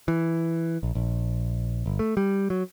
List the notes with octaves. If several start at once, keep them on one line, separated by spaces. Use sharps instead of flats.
E3
A#1
A#1
G1
A3
G3
F#3